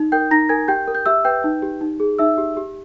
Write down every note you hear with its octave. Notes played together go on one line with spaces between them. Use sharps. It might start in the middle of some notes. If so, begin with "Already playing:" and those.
Already playing: D#4
A#4 G5 G6
D#4 A#5 A#6
A#4 G#5 G#6
G4 G5 G6
A#4
G6
G4 E5 E6
B4 G5 G6
D#4
G4
D#4
G#4
D#4 E5 E6
G4
G4